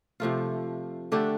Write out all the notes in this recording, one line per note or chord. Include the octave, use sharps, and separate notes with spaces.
C3 F3 A3 F4
D3 A3 D4 G4